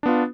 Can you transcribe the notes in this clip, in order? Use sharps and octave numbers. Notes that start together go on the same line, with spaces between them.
B3 D4 F4